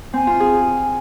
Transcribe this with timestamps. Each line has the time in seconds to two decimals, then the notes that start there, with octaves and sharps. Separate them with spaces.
0.13 C4 G#5
0.27 F4
0.40 G#4